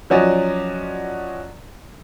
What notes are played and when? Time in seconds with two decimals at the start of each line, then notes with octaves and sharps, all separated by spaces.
0.10 F3 F#3 C#4 F#4 D5 D#5